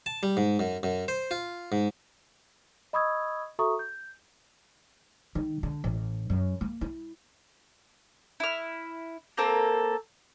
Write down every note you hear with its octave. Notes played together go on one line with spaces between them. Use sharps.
A5
G3
G#2
F#2
F#2
C5
F4
G#2
D#5 B5 C#6 D#6 E6 G#6
F#4 A4 E5 A#5 C#6 D#6
G6
D#3
D3
A1
F#2
A#3
E4
E4 F6
A#3 C4 A4 A#4